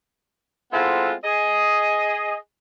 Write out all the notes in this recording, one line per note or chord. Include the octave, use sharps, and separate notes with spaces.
G#3 B3 C4 E4 F4 A4
G#4 D#5